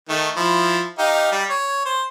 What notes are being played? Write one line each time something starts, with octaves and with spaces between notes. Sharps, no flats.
D#3 A3
F3 E4
D#4 G4 F5
G3
C#5
C5